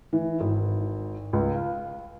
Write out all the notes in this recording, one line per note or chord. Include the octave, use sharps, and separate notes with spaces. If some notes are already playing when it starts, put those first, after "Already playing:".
E3
G#1
C#2
F5